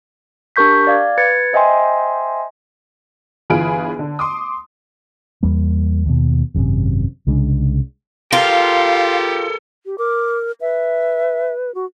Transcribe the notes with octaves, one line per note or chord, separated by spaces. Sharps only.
D4 G4 A#4 C#6 G6 B6
D5 F5 G#6
B4 G#6 A6 C#7
C5 D#5 E5 G5 G#5 C6
G1 E3 F4 G#4 B5 D7
D3
C6 D6 D#6
E2 G3 A#3
D#2 B2
G#1 F#2 C3
C2 C#3 G#3 D4
F4 G4 A4 A#4 F5
G4
A#4 D6
B4 E5
F#4